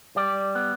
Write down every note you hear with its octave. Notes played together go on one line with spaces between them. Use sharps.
G3 D5
B3